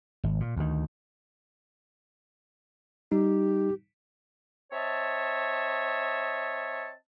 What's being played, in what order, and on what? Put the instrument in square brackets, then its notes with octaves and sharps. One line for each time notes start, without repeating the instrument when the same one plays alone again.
[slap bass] G#1
A#2
D2 D#3
[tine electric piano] G3 D#4 [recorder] G4
[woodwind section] C4 C#5 D#5 E5 A5